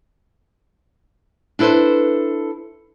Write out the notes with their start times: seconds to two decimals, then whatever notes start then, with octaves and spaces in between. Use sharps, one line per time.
1.59 D4 E4 A4 B4 C5